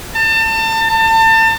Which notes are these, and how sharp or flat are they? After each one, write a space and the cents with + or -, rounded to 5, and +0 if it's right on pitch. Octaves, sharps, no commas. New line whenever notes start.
A5 +30
A5 +30